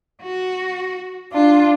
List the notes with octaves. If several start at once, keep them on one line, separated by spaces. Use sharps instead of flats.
F#4
D4 F4